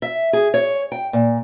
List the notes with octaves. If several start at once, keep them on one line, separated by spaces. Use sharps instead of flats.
E5
G#4
C#5
G5
A#2